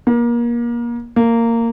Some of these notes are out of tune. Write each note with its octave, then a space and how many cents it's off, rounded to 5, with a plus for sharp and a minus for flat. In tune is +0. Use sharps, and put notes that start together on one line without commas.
A#3 +30
A#3 -15